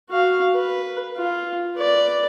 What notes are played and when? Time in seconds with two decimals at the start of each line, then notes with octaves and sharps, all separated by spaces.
0.10 F#4 F5
0.54 B4
1.17 F4
1.76 B4 D5